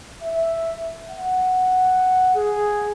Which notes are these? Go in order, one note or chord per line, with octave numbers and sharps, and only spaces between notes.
E5
F#5
G#4